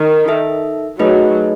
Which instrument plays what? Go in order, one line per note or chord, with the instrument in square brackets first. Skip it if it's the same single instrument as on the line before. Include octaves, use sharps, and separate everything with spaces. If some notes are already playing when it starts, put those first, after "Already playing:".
Already playing: [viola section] D#3
[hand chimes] D#4 A4 E5
[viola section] F#3 [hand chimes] A3 D#4 G#4 B4 D#5